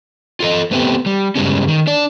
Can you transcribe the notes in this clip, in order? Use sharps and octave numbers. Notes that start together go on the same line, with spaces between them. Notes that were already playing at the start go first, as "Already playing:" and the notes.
F4 A4 D#5
A3 B3 C4 G4
G3
G2 C#3 G3 G#3 B3 C#4
D#3
D4 D5